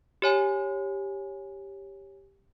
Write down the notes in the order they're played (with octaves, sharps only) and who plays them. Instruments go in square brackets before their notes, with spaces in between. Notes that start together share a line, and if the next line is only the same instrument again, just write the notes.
[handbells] G4 C#5 G#5